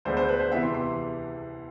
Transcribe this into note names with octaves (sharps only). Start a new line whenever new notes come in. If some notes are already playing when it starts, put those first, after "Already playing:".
D2 D3 G#3 B3 C5
C5
B4
C5
E2 C3 E3 E5
C6
C6